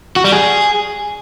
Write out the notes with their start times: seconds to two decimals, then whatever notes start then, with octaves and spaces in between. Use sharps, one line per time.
0.16 F#4
0.24 G3
0.32 G#4